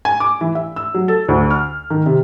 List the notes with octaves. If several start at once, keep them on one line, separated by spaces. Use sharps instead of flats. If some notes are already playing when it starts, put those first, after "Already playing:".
G#5
D6
E3
E5
E6
F#3
A4
D2
F6
D#3
C3